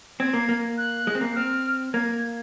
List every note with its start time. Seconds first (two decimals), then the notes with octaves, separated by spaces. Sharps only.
0.20 C4 G#6
0.33 A#3
0.49 A#3
0.78 F#6
1.07 G#3
1.15 C4
1.21 A#3
1.36 C4 F6
1.94 A#3 G#6